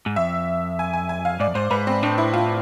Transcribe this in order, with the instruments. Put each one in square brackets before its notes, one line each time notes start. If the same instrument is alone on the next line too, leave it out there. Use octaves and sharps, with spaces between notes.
[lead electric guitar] G#2
[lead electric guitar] F2 [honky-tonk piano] E5
[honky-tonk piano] G#5
G#5
G#5
F5
[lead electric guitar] G#2 [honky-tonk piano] D5
[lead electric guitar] F2
[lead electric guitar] G#2 [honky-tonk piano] C5
[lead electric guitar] G#2 [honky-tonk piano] B4
[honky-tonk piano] C4
[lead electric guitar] A2 [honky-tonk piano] D4
[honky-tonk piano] E4
F4